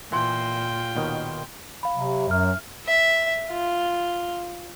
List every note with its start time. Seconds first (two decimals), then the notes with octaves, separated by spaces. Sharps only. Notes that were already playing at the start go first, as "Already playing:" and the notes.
0.12 A#2 E3 F4 G5 C6
0.96 D#2 B2 D#3
1.83 F5 B5
1.96 C3 F#3
2.28 F#2 F#3 E5 F6
2.86 E5
3.49 F4